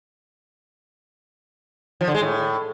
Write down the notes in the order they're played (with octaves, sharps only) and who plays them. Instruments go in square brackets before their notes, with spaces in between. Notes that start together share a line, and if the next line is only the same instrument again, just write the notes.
[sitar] F3
D3
G#3
A2